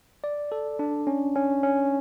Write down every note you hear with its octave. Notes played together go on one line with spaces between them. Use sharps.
D5
A4
D4
C#4
C#4
C#4